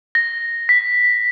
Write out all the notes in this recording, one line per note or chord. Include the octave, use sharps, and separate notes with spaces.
A#6
B6